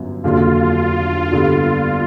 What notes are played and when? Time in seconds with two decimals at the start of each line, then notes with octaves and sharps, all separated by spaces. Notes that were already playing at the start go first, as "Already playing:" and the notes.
Already playing: G1 F#2 F#3
0.23 F1 D#2 D3 F#3 F4
1.32 G2 D3 G3 B3